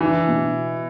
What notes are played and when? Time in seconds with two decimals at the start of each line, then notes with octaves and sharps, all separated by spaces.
0.01 E3 D4
0.28 B2